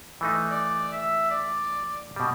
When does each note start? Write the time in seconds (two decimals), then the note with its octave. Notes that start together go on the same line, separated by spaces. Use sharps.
0.21 E3 A3 D#4
0.51 D5
0.93 E5
1.30 D5
2.16 B2 G3